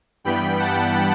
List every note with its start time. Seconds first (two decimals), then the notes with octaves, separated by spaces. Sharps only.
0.24 G2 E3 G3 B3 G5 B5
0.59 F#5 A5